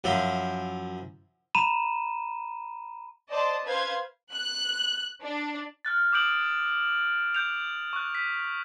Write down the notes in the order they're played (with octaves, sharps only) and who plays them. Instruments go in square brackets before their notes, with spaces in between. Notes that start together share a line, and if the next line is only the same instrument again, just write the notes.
[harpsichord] F#2 F3 E4
[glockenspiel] A#5 B5 D#7 E7
[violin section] C5 D5 D#5 A5
B4 C5 F5 G#6
F#6
D4
[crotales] F6 F#6 A6
D6 D#6 G6 D7 F#7
G6 D7 F7
C#6 F#6
B6